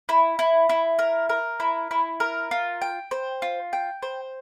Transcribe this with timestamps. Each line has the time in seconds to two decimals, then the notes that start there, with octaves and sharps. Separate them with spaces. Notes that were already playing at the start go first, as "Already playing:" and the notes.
0.09 E4
0.39 E4
0.70 E4
0.99 A#4
1.29 A#4
1.60 E4
1.91 E4
2.20 A#4
2.51 F4
2.82 G5
3.11 C5
3.42 F4
3.73 G5
4.03 C5